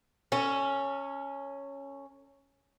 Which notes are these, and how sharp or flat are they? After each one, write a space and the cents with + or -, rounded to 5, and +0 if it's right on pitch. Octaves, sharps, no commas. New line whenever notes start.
C#4 +0 A4 +40